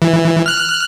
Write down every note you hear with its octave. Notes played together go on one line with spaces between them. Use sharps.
E3
F6 F#6